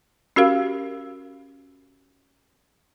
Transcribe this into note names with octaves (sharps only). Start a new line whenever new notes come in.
C#4 F#4 G4 A#4 F5